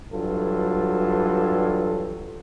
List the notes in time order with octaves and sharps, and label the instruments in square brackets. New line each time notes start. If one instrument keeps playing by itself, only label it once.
[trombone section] G2 E3 F#3 F4 A4